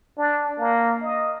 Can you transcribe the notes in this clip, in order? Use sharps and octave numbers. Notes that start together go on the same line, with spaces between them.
D4
A#3
D#5